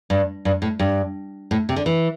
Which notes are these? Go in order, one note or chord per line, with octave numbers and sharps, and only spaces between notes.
G2
G2
A2
G2
A2
C3
D3
E3